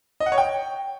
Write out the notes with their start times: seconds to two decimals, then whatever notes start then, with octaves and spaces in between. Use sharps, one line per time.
0.20 D#5
0.26 F#5
0.32 C#5
0.38 G5